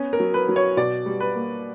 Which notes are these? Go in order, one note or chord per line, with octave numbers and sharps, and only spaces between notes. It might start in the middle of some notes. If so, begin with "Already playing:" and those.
Already playing: B3 C#4
A#4
F#3
B4
F#3
C#5
B2 D5
G3
B4
A#3